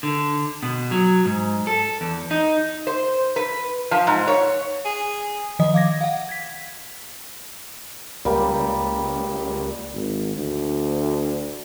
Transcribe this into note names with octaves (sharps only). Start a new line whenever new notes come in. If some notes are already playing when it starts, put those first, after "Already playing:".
D3
B2
F#3
G#2
A4
E2
D#4
C5
B4
F3
G#2
C#5
G#4
D#3 F3 D#5 D#6
F5 D6 G#6 A#6
F5 F#5
G#6 B6
C#2 G3 A#3
G#1
D2